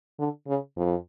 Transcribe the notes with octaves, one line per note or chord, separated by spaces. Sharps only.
D3
C#3
F2